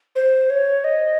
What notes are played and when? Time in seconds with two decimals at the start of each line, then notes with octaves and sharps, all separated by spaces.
0.15 C5
0.50 C#5
0.84 D#5